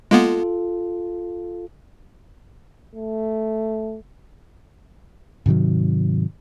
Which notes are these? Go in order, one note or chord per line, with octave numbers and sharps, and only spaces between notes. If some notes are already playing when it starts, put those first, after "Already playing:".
G#3 A#3 B3 F4 A4
A3
G#2 C3 D#3 F#3